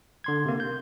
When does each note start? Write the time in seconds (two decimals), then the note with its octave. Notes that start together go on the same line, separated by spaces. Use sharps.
0.24 D3 C6 G#6
0.45 C3 A#3
0.60 G6